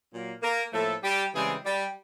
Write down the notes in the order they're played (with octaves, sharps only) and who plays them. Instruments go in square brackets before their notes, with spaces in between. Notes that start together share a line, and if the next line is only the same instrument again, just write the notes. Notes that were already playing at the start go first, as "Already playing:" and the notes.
[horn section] A#2 F#3 A#3
A#3 A#4
A2 F3 A3 A#3 A4
G3 G4
C#3 E3 G3 G#3 C4 G#4
G3 G4